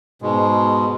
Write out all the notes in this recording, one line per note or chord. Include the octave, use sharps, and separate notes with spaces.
G#2 B2 G#3